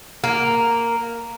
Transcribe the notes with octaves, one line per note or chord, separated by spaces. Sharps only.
A#3